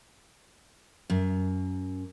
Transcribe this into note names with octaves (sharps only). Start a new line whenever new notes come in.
F#2